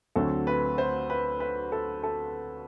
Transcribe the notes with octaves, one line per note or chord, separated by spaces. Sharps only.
D2 D3 F#3 C4 A4
B4
C5
B4
B4
A4
A4